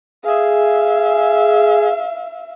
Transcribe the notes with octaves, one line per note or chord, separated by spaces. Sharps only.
G#4 E5 F5